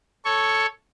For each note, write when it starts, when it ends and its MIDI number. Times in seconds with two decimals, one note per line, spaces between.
0.25 0.66 69
0.25 0.66 73
0.25 0.66 85